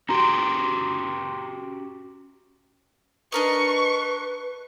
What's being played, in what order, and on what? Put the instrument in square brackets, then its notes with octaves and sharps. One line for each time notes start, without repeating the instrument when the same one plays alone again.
[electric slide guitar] C#4 F#4 G4 [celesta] A#5 C6
[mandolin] D4 A#4 D#5 [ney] B4 [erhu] C#6